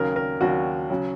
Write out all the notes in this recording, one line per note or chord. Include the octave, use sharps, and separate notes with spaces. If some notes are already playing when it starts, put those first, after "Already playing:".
Already playing: D#2 C#3 F#3 A#4
A#4
D#2 C#3 F#3 F#4
C#3 F#3